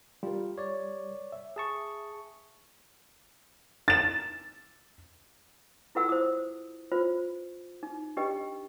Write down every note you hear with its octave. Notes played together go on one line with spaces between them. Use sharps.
G3 F4 A#4
C#5 D5
E5
G#4 A5 C#6
A6 E7
E4 F4 A4 B4 F#5 E6
C5 D#6
F4 B4 C5
D#4
D4 G4 B4 D#5 G5